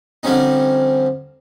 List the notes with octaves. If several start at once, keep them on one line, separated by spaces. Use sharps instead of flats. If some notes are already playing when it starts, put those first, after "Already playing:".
D3 F3 G3 C4 C#4 D#4